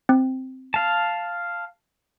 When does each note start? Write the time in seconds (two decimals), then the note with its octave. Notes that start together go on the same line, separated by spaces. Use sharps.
0.09 C4
0.74 F5 A5